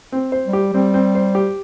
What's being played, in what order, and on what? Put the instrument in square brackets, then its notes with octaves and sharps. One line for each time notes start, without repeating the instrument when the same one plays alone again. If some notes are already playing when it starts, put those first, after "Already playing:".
[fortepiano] C4
C5
[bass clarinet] G3
[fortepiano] G4
[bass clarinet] G3 [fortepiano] C4
[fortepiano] C4
C5
G4